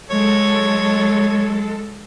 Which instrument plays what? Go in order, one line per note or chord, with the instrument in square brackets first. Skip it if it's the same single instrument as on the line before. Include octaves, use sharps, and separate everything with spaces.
[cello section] F#3 G#3 A4 [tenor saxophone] C#5